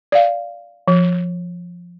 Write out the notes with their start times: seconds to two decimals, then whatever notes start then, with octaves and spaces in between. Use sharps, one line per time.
0.12 D5 F5
0.88 F3